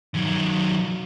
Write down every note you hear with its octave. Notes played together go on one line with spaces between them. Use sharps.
D#3 F#3